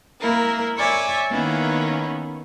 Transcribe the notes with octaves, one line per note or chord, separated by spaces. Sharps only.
A#3 E4 A#4
C#5 D5 E5 G#5
D#3 A#3 B3 C#4 E4